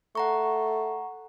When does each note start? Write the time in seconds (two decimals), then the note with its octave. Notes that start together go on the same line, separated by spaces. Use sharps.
0.15 A3 F#5 A#5 C#6